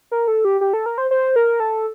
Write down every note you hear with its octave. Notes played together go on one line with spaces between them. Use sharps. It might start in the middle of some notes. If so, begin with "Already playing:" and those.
A#4
A4
G4
G4
A4
A#4
C5
C5
A#4
A4